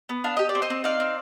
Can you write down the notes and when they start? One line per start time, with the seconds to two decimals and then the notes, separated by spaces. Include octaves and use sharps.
0.09 B3
0.24 D4 F5
0.37 G4 D#5
0.49 D5
0.55 C4
0.62 C5 D#5
0.70 C4
0.84 D#4 D5 F5
1.00 C4